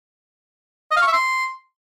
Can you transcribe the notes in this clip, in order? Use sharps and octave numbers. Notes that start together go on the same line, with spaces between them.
D#5
F5
C#6
E5
C6